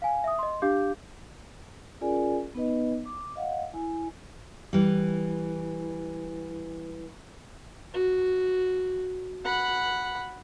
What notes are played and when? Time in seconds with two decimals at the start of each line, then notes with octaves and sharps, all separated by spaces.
0.02 F5 G#5
0.24 E5 D#6
0.39 D#5 C6
0.62 D4 G4 F5 D6 G6
2.01 C#4 F4 G#4 A#4 D5 G#5
2.54 B3 D#4 B4 D#5
3.05 D6
3.36 D#5 F5 F#5
3.73 E4 G#5
4.73 E3 G3
7.94 F#4
9.45 F#5 B5